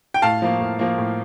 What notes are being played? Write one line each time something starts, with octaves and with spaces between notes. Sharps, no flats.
G5
A2 F5 A5
F3 A#3
A2
F3 A#3
A2